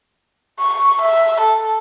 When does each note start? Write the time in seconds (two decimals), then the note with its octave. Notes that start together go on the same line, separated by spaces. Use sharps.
0.60 C#6
1.01 E5
1.41 A4